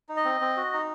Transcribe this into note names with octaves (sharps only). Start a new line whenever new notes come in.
D#4
D#5
C4
C4
F#4
D#4